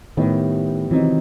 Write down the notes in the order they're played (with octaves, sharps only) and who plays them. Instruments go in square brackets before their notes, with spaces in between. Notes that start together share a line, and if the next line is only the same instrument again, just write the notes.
[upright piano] A2 G3 B3 E4 G4 [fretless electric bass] D#3
[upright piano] C3 D#3 F#3 C4 D#4 [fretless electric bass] E3